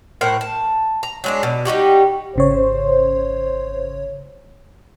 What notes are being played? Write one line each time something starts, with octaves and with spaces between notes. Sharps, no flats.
A2 A#4 C5 F#5
A5
A#5
F#3 G#3 D4
B2
G3 D#4 F#4 G4
G#1 C#3 C5 C#5